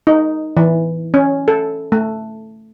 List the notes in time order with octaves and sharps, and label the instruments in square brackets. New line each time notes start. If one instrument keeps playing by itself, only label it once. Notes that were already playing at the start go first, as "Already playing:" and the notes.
[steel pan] D#4
E3
C#4
A4
A3